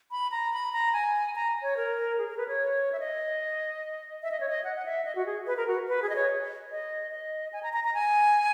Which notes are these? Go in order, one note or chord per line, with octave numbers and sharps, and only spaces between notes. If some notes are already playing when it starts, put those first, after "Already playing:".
B5
A#5
B5
A#5
G#5
A#5
C#5
A#4
G#4
A#4
B4
C#5
E5
D#5
E5
D#5
C#5
D#5
F#5
F#5
E5
D#5
F#4
G#4
B4
A#4
F#4
B4
G#4
D#5
C#5
D#5
D#5
G#5
A#5
A#5
A#5
G#5